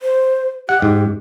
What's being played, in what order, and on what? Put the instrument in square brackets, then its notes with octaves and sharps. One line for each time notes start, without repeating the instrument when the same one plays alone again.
[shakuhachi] C5
[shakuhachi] G4 [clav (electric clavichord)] F#5
[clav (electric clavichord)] G#2